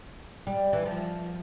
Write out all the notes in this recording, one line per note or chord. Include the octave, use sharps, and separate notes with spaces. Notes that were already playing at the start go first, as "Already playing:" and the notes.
G3
E3
F3